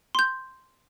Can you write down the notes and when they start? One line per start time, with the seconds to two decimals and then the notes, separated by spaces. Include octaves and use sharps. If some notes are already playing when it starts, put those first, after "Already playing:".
0.15 C6 G6